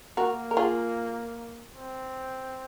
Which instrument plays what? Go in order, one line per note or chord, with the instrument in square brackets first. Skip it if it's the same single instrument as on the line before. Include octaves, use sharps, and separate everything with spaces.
[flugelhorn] A#3 [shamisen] F#4 A#4
[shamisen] A#4
F4 G#4
[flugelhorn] C4